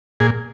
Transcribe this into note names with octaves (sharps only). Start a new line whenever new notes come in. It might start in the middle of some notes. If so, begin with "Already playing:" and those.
A#2 G#4